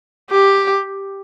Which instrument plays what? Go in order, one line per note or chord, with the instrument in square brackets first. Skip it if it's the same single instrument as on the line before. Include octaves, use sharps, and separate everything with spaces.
[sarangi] G4